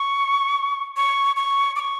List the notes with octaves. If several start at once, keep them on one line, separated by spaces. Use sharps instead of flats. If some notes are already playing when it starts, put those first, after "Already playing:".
Already playing: C#6
C#6
C#6
D6
C#6